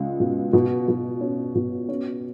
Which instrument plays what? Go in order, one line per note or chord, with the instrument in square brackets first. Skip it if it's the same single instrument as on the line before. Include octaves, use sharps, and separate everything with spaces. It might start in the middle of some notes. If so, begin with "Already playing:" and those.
Already playing: [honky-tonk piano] C#2
B2
B2
B2
C#4
B2
C#4